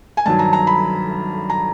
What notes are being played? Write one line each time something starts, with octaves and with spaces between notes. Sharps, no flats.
G#5
G2 D#3 F#3 A5
A#5
A#5
B5
A#5